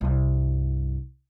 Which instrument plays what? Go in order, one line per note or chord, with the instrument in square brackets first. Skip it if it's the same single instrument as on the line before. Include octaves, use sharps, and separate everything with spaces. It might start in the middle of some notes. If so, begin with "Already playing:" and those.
[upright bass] C2 G2